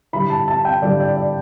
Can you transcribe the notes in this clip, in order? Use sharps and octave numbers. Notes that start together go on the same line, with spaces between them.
D3 G3 E4 B5
A5
A5
G5
D3 G3 E4 D5
D5
D5